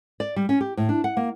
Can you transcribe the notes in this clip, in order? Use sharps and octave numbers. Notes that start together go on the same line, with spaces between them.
D5
G3
C#4
G4
A2
D4
F#5
A#3